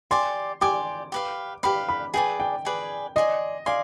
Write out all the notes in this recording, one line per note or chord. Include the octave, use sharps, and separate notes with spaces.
G4 D5 G#5 C6
G4 D5 G#5 D6
G4 B4 F5
G4 B4 F5 B5
B5
G#4 B4 D5 G5 G#5
G5
G#4 B4 D5 G#5
D5 D#5 G#5 C6
D5 F5 G#5 C6